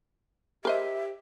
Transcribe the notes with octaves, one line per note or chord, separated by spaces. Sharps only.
G4 A#4 C5 D#5 E5